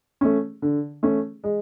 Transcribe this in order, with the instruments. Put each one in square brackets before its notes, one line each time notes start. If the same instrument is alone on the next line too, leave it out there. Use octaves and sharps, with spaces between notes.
[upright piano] A3 C#4
D3
A3 C#4
G#3